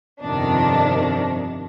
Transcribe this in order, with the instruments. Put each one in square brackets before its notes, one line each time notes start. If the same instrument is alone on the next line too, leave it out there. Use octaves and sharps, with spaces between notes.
[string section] G1 F2 C3 D#3 D4